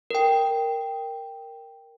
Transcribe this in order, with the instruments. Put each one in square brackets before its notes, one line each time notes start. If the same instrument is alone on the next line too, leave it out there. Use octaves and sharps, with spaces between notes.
[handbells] A#4 G5